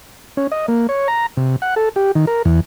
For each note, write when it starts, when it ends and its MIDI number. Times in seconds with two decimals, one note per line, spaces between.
0.37 0.47 61
0.52 0.66 75
0.68 0.87 58
0.89 1.08 73
1.08 1.26 82
1.37 1.56 48
1.62 1.75 78
1.76 1.89 69
1.96 2.12 67
2.15 2.25 51
2.27 2.42 70
2.45 2.60 40